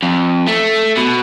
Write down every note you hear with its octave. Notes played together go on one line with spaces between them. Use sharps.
F2
A3
B2